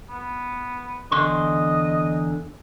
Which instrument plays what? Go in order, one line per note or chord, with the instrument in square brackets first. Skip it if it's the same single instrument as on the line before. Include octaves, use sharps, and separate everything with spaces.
[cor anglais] B3
[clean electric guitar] E2 D3 C6 [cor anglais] D#5